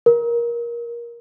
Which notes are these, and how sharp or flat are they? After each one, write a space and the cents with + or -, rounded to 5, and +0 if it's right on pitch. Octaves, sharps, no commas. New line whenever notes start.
A#4 +20